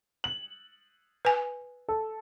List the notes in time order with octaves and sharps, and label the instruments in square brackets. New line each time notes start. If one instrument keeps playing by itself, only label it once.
[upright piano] F#7
[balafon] B4 G#5
[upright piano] A4